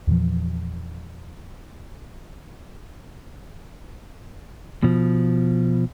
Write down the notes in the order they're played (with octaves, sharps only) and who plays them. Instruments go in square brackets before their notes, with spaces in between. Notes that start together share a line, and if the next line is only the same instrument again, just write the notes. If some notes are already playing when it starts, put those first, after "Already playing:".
[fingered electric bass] E2 A#2 E3 F3
[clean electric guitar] B2 F3